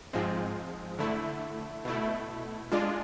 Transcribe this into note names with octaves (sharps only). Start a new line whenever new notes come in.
G#2 F3 G#3 C4
D3 A3 E4
B2 A3 E4
G#3 D4 F4